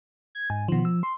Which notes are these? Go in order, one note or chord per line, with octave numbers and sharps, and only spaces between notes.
G#6
G#2 G#5
B2 D#3 F3
F3 E6
C6